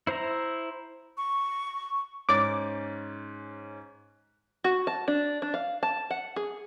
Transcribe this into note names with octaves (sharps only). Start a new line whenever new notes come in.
E4 C5 E5 A#5
C#6
G#2 C#4 D6 A6
F#4
A5
D4
D4
F5
A5
F#5
G#4